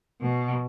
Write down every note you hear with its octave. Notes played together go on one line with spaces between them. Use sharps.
B2